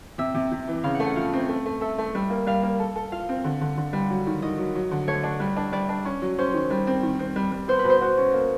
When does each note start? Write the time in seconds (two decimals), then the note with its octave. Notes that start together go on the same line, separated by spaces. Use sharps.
0.18 C3 E5
0.35 C3
0.52 C3
0.68 E3
0.84 C#3 F5
0.95 F#5
1.00 A3
1.06 F#5
1.16 F3 F5
1.33 C4
1.49 A3
1.66 A3
1.81 A4 E5
1.98 A3
2.15 G3
2.30 A#3
2.47 G3 F5
2.62 A#3
2.80 A4
2.96 A4
3.12 F4 F5
3.29 C4
3.44 D3
3.61 D3
3.77 D3
3.93 G3
4.10 F#3
4.27 D#3
4.42 D#3 D#5
4.58 F#3
4.75 F#3
4.91 D3
5.08 A3 C#5
5.23 D4
5.40 G3
5.57 D4
5.72 G3 D5
5.89 D4
6.05 C#4
6.22 F#3
6.38 C#4 C5
6.54 D#3
6.70 G3
6.87 C4
7.03 D#3
7.19 C4
7.36 G3
7.52 G3
7.68 B3 C5
7.79 B4
7.84 B2
7.90 C5
8.01 F#4
8.18 C#4
8.33 A#3